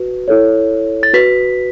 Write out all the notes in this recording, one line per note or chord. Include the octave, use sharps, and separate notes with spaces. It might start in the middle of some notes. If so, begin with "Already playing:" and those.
Already playing: F#4 B4
E4 A4 C#5
A6
F#4 B4 B6